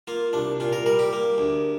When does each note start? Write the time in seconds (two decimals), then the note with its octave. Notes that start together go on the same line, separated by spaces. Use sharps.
0.07 A#3 F4
0.33 C2 D4
0.60 A#2 F4
0.73 A#4
0.86 G3 A#4
0.99 G4
1.13 A#3
1.38 D2